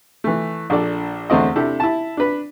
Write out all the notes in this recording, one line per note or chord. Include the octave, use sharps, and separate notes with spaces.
E3 A3
A#1 D4 A4 D5
E2 D3 A3 C4 D#5
C3 D4 E4 G4 A4
E4 A5
D4 B4